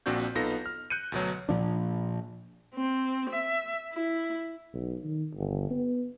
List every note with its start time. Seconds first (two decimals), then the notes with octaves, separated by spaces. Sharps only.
0.06 A#1 A#2 C4 D4 F#4 G6
0.35 B1 B3 D#4 F4 A4 A#6
0.66 F6
0.90 F#6 G6 C#7 D#7
1.12 D2 B2 F#3
1.49 A#2 F3 D4
2.75 C4
3.30 E5
3.94 E4
4.74 B1
5.03 D#3
5.35 G1
5.70 B3